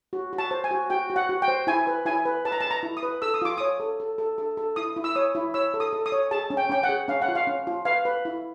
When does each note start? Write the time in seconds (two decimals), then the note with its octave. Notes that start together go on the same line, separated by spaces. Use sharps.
0.13 F#4
0.33 F#4
0.38 A5
0.51 C5
0.64 G#5
0.71 F#4
0.90 F#4 G5
1.10 F#4
1.16 F#5
1.29 F#4
1.42 G5
1.48 C5
1.67 E4 G#5
1.87 B4
2.06 E4 G#5
2.25 B4
2.45 B4 A5
2.52 A#5
2.60 A5
2.64 B4
2.71 A#5
2.83 E4
2.97 D#6
3.03 B4
3.22 A4 E6
3.34 D#6
3.42 F4 D6
3.58 C#5 D#6
3.80 A4
4.00 A4
4.18 A4
4.38 A4
4.57 A4
4.76 E4 D#6
4.96 E4
5.04 E6
5.15 C#5 D#6
5.35 E4
5.54 C#5 E6
5.74 A4
5.80 D#6
5.93 A4
6.06 D#6
6.12 C#5
6.31 G#4 A5
6.50 C#4
6.57 G5
6.69 C#4 G5
6.83 F#5
6.89 G#4
7.08 C#4 F5
7.22 F#5
7.28 F4
7.35 F5
7.47 C#4
7.67 F4
7.85 B4 F5
8.05 B4
8.25 E4